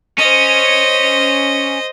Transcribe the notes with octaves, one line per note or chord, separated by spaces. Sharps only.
C#4 C5 D#5